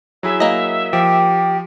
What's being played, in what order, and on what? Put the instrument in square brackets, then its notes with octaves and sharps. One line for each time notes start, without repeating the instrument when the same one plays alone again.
[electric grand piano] F#3 E4 G#4 [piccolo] E5
[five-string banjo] A#3 D#5
[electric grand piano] F3 [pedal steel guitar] G4